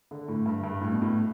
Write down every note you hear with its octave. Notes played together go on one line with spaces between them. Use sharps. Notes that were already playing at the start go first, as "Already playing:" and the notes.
D3
A2
G2
G2
A2
B2
A2